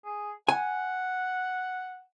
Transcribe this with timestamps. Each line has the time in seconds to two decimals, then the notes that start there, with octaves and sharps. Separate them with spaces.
0.05 G#4
0.49 F#5 G#5